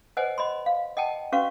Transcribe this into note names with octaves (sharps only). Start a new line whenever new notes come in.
B4 C5 D#5 F#5 G#5
D#5 B5 C6
F5
D#5 F#5 G5 A5
C#4 F#4 B4 F5 C#6